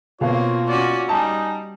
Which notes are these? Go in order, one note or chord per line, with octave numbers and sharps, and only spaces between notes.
B2 A#3 C4 F4 C#5 F5
C#4 F#4 D5
G3 D#4 G#5 A5